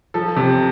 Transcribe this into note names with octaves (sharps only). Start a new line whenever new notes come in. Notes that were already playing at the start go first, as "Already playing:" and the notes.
F3 A4
C3